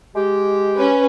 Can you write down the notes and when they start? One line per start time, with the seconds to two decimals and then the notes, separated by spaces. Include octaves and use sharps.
0.15 G#3 G4
0.76 C#4 B4